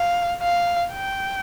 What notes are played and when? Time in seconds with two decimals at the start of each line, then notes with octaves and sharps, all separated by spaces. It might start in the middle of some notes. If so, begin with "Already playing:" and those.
Already playing: F5
0.42 F5
0.93 G5